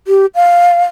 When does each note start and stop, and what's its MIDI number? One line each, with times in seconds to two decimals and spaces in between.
0.08 0.26 67
0.35 0.84 77